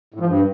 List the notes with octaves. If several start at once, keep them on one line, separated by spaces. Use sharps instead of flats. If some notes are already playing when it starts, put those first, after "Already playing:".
A2
F3
G2